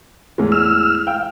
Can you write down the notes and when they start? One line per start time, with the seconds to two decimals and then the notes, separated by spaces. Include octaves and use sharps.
0.38 E2 A2 G#3
0.52 E6 F6
1.07 F5 G5